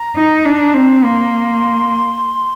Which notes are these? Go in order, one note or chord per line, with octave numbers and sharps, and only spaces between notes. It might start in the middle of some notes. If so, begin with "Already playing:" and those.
Already playing: A#5
D#4
D4
C4
A#5
A#3 C6